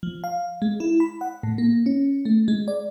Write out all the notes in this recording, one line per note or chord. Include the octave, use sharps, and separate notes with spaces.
F3
F5
G#3
E4
B5
F#5
A2
A#3
C#4
A3
G#3
D5